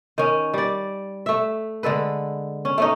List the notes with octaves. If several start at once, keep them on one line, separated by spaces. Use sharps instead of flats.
D#3 C#4
G3 D5
A3 E5
D3 G#3 A4 B4
C#4
A3 C#4 D#4